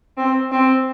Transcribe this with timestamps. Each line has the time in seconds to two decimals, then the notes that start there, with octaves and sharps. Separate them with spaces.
0.17 C4
0.52 C4